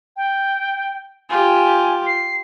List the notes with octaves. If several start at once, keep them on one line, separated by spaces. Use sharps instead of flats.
G5
F4 G4 G#5
C7